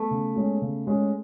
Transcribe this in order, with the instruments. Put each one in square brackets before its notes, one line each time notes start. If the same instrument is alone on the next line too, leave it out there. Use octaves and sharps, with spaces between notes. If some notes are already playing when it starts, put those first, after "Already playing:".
Already playing: [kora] A3 B3
[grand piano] C#3
G#3 C#4 G#4
C#3
G#3 C#4 G#4